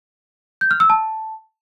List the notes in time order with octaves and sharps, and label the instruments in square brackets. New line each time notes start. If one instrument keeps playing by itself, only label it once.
[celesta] G6
F6
E6
A5